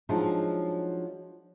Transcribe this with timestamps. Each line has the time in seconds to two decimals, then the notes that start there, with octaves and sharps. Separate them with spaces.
0.09 F3 F#3 G#3 D4 D#4